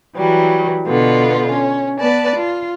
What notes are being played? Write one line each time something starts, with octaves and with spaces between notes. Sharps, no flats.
E3 F#3 G3
B2 D3 B3 F4
C#4
B3 B4 D5 A5
F4